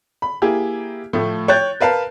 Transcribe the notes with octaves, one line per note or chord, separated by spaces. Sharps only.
B5
A#3 E4 G4 G#4
A2 F3 A3
C#5 G5 F#6 G6 A6
A#4 B4 F5 A5